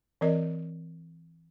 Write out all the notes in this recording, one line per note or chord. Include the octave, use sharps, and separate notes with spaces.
E3 C4 A#4 D5 D#5